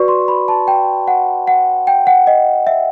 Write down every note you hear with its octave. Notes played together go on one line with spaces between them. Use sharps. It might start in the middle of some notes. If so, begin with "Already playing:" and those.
Already playing: F#4 B4 D5 C#6
C6
B5
A5
G5
F#5
F#5
G5
F#5
D#5
E5